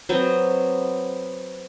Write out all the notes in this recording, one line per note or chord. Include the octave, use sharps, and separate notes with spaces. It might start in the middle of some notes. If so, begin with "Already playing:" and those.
F#3 B3 C4